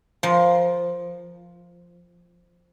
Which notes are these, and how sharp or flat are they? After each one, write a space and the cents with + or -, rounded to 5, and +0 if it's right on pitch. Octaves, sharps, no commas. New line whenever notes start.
F3 +0 A#4 +25